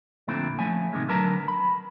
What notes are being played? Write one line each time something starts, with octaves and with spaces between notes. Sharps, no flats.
F2 A#2 D3 A3 C4 E4
F3 A3 C#4 E5 G#5
A2 C3 D#3 G#3
D3 F#3 A#4 B4 A5 A#5
B5